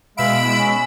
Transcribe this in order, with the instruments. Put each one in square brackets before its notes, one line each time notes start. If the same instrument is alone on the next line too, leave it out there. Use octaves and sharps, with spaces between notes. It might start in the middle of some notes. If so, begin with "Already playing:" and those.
[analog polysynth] B2 E6 D7 [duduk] G#3 [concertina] E5 F5 [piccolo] B5
[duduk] G#3 [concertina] E4
[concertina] C#4